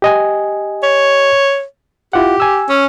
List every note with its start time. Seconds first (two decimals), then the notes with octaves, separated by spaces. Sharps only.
0.02 G4 D#5 G#5
0.83 C#5
2.13 E4 F4 G4 F#5
2.40 G#5 E6
2.69 C#4